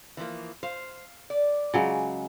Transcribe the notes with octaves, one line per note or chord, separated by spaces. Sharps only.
E3 F3 A#3
C5 F5
D5
C#3 F#3 G#3